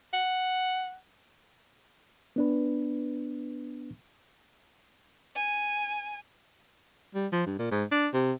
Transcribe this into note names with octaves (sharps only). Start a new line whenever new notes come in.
F#5
B3 D4 B4
G#5
G3
F3
G2
A#2
G#2
D4
C3